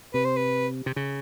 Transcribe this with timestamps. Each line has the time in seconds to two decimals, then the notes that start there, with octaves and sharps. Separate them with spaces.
0.14 C3 B4
0.25 C5
0.36 B4
0.86 C3
0.96 C#3